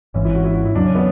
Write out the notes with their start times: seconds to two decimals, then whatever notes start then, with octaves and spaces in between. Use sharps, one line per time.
0.14 G#1 G#2 E3 C#4
0.25 E4
0.35 F#4
0.45 E4
0.55 F#4
0.65 E4
0.75 E2 C#3 F#3 D4
0.85 C#4
0.95 B3